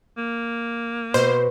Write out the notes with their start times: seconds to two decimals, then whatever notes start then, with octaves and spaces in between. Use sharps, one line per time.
0.17 A#3
1.14 B2 C5